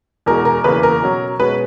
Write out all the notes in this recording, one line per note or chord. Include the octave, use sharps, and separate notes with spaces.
E2 B2 G#3 A#4
A#4
E2 C#3 E3 A#3 B4
A#4
B2 F#3 C#4
B2 G#3 C#4 B4